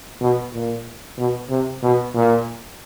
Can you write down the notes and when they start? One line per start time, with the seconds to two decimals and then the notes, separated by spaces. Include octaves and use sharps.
0.22 B2
0.54 A#2
1.18 B2
1.50 C3
1.83 B2
2.15 A#2